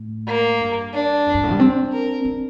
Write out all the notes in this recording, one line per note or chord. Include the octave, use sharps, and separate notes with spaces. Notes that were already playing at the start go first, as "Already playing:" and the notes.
Already playing: A2
A#3
G2
D4
F2
G2
A2
G3
C4
A#4
C4